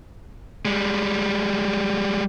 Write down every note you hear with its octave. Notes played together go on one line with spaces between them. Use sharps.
G3 G#3